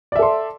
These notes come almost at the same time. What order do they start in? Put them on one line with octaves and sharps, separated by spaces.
D5 E5 A4 C6